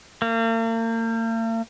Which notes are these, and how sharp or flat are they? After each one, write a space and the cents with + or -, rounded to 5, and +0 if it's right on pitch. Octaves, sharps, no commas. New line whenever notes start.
A#3 -45